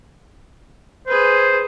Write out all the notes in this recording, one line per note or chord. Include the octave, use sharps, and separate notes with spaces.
G#4 B4 C5